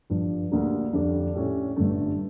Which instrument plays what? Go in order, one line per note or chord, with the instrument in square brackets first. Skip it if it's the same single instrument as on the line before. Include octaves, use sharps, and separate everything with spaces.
[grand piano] G1 G2 F3
D2 D3 G3 A#3 D4
F2 D3 G3 D4
A2 G3 C#4 E4
G1 G2 D3 A3